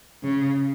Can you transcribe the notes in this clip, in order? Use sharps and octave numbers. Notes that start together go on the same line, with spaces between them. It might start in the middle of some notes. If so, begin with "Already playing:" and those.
C#3